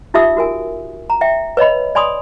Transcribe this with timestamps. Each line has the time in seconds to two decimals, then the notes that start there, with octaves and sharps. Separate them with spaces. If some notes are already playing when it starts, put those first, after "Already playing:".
0.14 D#4 F4 G4 E5 D#6 E6
0.37 F#4 A#4 G#5
1.10 A#5
1.21 E5 G5
1.57 B4 C#5 D#5 B5
1.95 D5 G#5 B5 C6 D#6